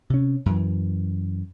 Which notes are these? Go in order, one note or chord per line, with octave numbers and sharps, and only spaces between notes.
C3 C#4
F#2 E3